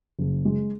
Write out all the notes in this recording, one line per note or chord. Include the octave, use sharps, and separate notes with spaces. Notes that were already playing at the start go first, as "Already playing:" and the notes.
F#1
G#3